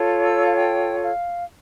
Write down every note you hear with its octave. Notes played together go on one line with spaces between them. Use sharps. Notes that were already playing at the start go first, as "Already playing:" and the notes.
Already playing: F4 A4 C#5
E6
F5
G5
F5